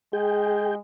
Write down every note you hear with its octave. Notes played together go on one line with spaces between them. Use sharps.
G#3 G#4 G5